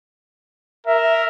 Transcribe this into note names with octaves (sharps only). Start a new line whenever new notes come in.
A#4 E5